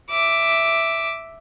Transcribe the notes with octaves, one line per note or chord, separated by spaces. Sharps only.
E5 D6